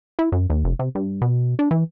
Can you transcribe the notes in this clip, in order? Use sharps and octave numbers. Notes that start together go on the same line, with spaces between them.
E4
F#2
D#2
F1
C3
G2
B2
D4
E3